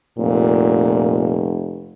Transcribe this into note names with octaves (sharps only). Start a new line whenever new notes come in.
F1 A#2